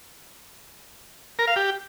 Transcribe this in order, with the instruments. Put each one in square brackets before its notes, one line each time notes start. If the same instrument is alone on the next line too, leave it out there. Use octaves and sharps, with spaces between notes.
[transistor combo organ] A#4
F5
G4